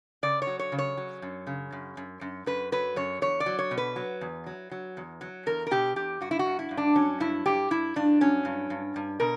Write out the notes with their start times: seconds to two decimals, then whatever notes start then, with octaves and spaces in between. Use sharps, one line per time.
0.23 C#3 D5
0.42 C#5
0.47 F#3
0.59 C#5
0.72 C#3
0.79 C#5
0.97 F#3
1.22 F#2
1.47 C#3
1.72 F#2
1.97 F#2
2.21 F#2
2.46 F#2 B4
2.72 F#3 B4
2.96 F#2 C#5
3.22 E2 C#5
3.40 D5
3.46 F#3
3.59 C#5
3.71 B2
3.78 B4
3.96 F#3
4.21 E2
4.46 F#3
4.71 F#3
4.97 E2
5.21 F#3
5.46 E2 A#4
5.67 A#4
5.71 B2 G4
5.96 E2 G4
6.21 G2 F#4
6.31 E4
6.39 F#4
6.46 G2
6.59 E4
6.71 G2
6.77 D4
6.96 F#3 C#4
7.20 G2 E4
7.46 G2 G4
7.70 G2 E4
7.96 G2 D4
8.21 F#3 C#4
8.45 G2
8.70 G2
8.96 G2
9.20 B2 A#4